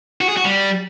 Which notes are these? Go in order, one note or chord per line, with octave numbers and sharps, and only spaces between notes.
F#4
G#4
F#4
G3